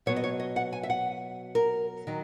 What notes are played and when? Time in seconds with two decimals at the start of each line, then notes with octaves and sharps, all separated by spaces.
0.06 B2 F#3 B3 C#5
0.16 D#5
0.24 C#5
0.40 D#5
0.56 F#5
0.73 G#5
0.83 E5
0.90 F#5
1.55 A#4
2.07 D#3 F#3